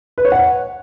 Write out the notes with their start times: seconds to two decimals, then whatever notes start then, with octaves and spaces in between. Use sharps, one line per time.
0.18 B4
0.25 C#5
0.32 F#5